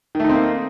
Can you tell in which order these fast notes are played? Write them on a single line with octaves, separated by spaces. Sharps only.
D#3 A3 D#4 C4 A#3